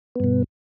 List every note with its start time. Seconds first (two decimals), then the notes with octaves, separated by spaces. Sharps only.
0.15 B3
0.20 G2
0.24 B2